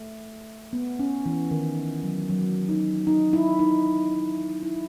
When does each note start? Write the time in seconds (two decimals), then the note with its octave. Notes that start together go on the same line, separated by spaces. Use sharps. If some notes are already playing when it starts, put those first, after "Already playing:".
Already playing: A3
0.73 B3
0.99 C#4
1.26 E3
1.51 D#3
2.03 F#3
2.30 F#3
2.69 D#4
3.07 D#4
3.33 E4
3.59 D#4
4.63 E4